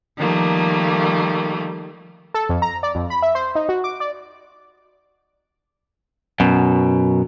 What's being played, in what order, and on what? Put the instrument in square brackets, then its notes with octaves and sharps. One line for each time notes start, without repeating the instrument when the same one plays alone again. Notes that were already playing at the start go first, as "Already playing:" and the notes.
[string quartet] D#3 F3 G3 A3 A#3
[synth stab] A4
F2
A#5
D5
F2
B5
E5
C5
D#4
F#4
D6
D5
[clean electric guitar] F#2 B2